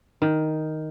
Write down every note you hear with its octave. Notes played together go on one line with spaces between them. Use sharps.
D#3